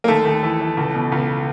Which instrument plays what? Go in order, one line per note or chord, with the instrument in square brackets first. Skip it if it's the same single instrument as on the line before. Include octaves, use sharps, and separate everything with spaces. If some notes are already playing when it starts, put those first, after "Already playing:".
[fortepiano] A#3
D#2 A3
D#2
E3
E3
C#2
B2
C#2